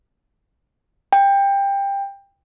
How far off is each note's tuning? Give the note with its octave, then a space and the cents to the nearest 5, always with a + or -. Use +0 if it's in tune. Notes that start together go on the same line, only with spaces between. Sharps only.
G5 +20